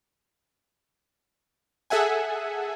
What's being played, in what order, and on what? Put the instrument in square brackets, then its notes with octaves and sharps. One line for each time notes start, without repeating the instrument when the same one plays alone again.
[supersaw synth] G#4 A4 E5 F#5 G#5